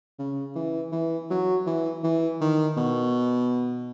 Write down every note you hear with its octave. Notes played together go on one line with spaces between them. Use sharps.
C#3
E3
E3
F#3
E3
E3
D#3
B2